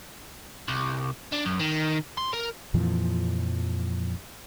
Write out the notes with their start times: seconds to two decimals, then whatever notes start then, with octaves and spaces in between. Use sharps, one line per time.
0.68 C2
1.32 D4
1.45 F#2
1.60 D#3
2.18 C6
2.34 A#4
2.74 F2 A#2 E3 F3